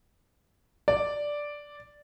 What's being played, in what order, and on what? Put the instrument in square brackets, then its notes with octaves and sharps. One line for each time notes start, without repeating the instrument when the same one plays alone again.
[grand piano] D5